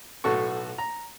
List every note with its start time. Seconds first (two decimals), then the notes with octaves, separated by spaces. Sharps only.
0.24 B1 A2 F#4 A4 C#6
0.78 A#5